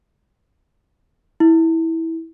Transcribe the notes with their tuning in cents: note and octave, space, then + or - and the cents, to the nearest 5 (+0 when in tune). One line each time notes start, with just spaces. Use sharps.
E4 -15